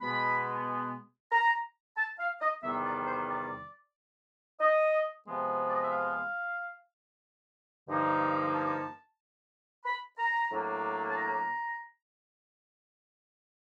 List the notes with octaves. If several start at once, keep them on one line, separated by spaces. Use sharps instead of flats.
B2 G#3 B3 B5
A#5
A5
F5
D#5
E2 C3 D#3 G3 B3 E5
D5
C5
D5
D#5
C3 F3 G#3 B3
D5
D#5
E5
F5
G2 D3 F3 A#3 D#4
A5
B5
A#5
A2 F#3 A#3 D4
A5
A#5